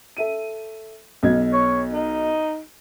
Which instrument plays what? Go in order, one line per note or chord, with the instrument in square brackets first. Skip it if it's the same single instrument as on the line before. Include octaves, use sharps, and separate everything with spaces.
[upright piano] A4 E5 D#7
B1 B2 G#6
[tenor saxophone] C#5
D#4